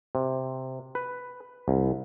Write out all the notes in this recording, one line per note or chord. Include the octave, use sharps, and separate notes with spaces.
C3
B4
C2